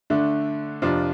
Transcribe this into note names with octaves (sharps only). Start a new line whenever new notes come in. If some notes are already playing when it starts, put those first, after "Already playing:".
D3 A3 D4
F2 C3 F3 D4 F4